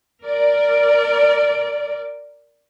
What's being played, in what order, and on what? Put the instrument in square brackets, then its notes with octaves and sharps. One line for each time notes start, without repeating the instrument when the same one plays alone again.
[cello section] A#4 D5